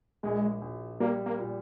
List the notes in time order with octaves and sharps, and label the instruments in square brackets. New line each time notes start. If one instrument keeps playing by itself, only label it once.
[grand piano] A#1 [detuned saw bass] G#3
[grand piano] A#1
[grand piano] G3 [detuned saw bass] A#3
[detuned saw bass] A#3
[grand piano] A#2